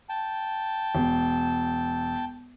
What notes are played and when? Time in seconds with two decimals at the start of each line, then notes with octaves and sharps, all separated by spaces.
0.09 G5 A5
0.95 E1